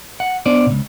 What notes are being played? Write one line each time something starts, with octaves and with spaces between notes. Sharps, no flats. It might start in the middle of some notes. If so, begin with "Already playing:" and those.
F#5
B3 D4 C5 D5
C#2 B2